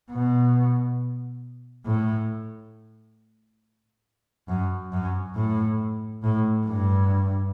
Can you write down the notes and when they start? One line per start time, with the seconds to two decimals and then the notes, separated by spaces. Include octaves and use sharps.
0.11 B2
1.86 A2
4.48 F#2
4.92 F#2
5.35 A2
6.23 A2
6.66 G2